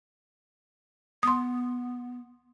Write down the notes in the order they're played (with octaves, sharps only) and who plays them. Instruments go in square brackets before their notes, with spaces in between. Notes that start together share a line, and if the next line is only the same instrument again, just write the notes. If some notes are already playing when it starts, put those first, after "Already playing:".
[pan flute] B3 [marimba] C6 D#6